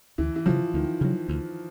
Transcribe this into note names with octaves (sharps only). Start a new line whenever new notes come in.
D2 E3
E3
C#3 F3 F#3
D2 D#3
C#3 F#3
D2